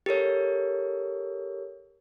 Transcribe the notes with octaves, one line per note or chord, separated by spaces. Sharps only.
G4 A4 A#4 C#5